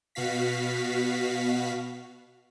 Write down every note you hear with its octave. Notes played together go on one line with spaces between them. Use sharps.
B2 F#4 F5 B6